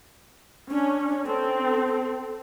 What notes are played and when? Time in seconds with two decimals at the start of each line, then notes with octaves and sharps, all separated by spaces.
0.71 C#4 D4
1.27 C4 A4